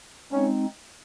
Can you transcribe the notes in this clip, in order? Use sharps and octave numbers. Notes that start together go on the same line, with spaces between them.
G#3 C4 C#4 D#4